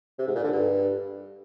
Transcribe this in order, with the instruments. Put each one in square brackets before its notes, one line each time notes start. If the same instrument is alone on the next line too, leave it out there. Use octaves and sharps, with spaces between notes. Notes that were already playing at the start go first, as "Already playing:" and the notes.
[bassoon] C3
G#2
A#2
D3
G2